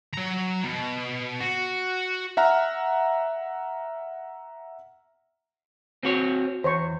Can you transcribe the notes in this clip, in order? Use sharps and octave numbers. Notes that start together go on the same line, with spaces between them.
F#3 A#5
B2
F#4
E5 F#5 A#5 F6
C4 F#4 C#5
E2 C5 C#5 C#6